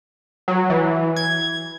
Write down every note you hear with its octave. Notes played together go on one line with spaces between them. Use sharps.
F#3
E3
G#6